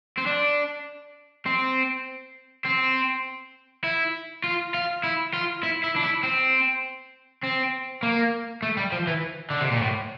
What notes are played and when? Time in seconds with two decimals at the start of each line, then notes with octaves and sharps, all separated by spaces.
0.18 C4
0.27 D4
1.46 C4
2.66 C4
3.84 E4
4.44 F4
4.74 F4
5.04 E4
5.34 F4
5.63 E4
5.84 E4
5.96 D4
6.04 E4
6.23 C4
7.43 C4
8.03 A#3
8.63 A3
8.77 G3
8.92 F3
9.08 E3
9.50 D3
9.61 C3
9.71 A#2
9.82 A2